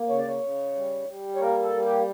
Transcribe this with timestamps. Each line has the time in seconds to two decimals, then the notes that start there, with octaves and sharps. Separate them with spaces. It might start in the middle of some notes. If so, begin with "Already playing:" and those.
Already playing: A#3
0.09 C#3 C#5
0.19 D5
0.28 C#5
0.42 C#3
0.75 G3
1.08 G3
1.35 C#5
1.41 A#3 A#4
1.63 A4
1.74 G3
1.85 G4